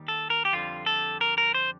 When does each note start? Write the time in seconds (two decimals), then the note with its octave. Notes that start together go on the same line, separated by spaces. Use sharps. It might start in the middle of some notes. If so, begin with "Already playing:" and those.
Already playing: D#2 D#3 G3
0.08 A4
0.30 A#4
0.45 G4
0.53 F2 D3 G3 F4
0.86 A4
1.21 A#4
1.38 A#4
1.54 C5